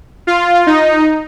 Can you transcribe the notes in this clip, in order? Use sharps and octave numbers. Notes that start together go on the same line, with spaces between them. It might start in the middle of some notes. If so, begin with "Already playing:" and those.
F4
D#4